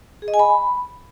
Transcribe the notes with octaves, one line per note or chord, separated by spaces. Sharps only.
G#4
D#5
G#5
B5